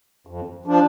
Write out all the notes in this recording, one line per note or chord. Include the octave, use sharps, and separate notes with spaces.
F2
F3 D4